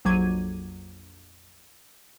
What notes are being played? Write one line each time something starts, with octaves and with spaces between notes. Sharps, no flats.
A#1 F2 F#3 D6 G#6 D#7